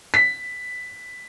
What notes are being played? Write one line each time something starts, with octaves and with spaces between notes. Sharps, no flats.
B6